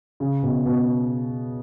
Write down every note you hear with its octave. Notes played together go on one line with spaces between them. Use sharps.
C#3
B2
B2